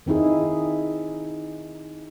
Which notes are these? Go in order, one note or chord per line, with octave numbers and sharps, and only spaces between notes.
D#3 C4 D#4 E4 G#4